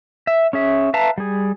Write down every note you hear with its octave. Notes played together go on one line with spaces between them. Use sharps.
E5
C#4 G#4 E5
B4 E5 F5 A5 A#5
G3 G#4